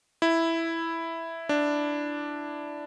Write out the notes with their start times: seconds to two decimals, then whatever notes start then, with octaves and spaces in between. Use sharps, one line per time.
0.22 E4
1.49 D4